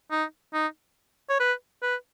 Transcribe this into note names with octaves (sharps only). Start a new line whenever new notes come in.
D#4
D#4
C#5
B4
B4